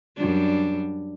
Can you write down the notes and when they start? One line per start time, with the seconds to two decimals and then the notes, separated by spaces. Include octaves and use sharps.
0.16 F#2 G3 D4